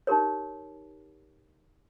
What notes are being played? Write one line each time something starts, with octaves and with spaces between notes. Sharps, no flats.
D#4 G4 A#4 C#5